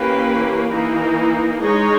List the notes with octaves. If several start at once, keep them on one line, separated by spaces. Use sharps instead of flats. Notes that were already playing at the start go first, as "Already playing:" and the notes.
Already playing: E3 A#3 C#4 G4 B4
E3 A#3 D#4
G#3 D#4 G#4 C#5